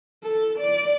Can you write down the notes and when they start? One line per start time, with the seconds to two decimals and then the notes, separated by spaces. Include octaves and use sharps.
0.23 A4
0.59 D5